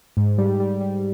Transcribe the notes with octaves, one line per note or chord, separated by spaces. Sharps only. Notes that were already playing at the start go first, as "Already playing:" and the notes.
G#2
G3
G3
G3